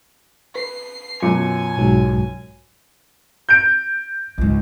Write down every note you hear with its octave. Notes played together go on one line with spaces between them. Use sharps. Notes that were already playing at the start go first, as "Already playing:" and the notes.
B4 C7
F#2 B2 C#4 F4 G#5 C#7
B1 G#2 F#3
G6 D7
C#2 G#2